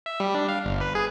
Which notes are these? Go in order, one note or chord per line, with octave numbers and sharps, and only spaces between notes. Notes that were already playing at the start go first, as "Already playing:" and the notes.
E5
G3
D4
F5
G1
B4
G#4